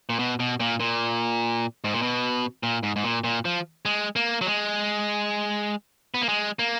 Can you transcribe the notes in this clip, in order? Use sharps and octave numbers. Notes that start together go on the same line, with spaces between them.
A#2
B2
B2
A#2
A#2
G#2
A#2
B2
A#2
G#2
G#2
A#2
A#2
F3
G#3
A#3
F#3
G#3
B3
A#3
G#3
A#3